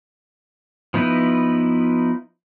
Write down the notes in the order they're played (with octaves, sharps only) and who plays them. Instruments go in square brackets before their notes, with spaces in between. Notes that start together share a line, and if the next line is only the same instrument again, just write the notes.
[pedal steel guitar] F3 B3 D#4 E4 B4